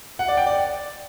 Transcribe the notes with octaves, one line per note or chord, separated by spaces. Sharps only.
F#5
D5
G5
D5